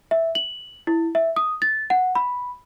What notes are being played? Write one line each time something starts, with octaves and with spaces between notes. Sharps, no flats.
E5
F#7
E4
E5
D#6
A6
F#5
B5